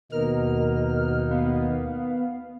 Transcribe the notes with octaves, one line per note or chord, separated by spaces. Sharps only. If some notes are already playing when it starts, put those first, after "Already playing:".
D#2 B2 A#3 D#4 A#4 F6
B3 F5